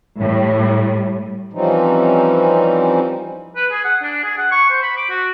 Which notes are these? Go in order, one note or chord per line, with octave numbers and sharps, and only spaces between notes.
A2 G3
E3 F3 G3 C4 C#4 D#4
B4
G#4
F#5
D4
G#4
F#5
C#6
C5
B5
D6
F#4